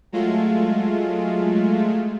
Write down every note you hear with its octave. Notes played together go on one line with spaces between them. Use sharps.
F#3 G#3 A3 F4